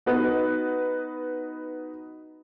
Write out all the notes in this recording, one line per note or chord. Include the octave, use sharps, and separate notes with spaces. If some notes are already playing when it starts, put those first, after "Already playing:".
B3 D#4 F#4 B4